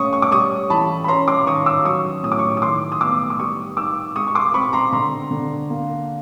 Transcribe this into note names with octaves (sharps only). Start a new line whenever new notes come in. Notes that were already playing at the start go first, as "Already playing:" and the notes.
Already playing: A3 C#4 C#6 D#6
C#6
D6
G3 C#6 D#6
E3 A5 B5
B5
C#4 A#5 C6
C6 D6
D#3 C#6 D#6
D6 E6
F#3 C#6 D#6
A2 D#6
D6
C#6 D#6
D#6
D#3 C6 D6
D#6
B3 D6 E6
D6
G3 C#6 D#6
D#4 D6 E6
G#3 C#6 D#6
C#6
C6 D6
C4 B5 C#6
A#5 C6
D3 A#5 C6
D3
A#3